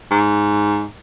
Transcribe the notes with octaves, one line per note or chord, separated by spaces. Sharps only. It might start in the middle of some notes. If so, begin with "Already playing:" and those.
G#2